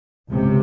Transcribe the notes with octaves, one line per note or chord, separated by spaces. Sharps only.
C#2 C3